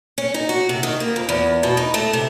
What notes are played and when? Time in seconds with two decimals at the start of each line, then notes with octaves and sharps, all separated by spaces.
0.18 C#4
0.34 D#4
0.49 F#4
0.69 C3
0.83 D#3
1.00 A#3
1.16 F2
1.29 E2
1.63 B2
1.77 D#4
1.94 A3
2.13 C3